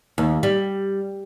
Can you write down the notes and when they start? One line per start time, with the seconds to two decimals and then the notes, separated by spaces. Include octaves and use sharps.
0.18 D#2
0.43 G3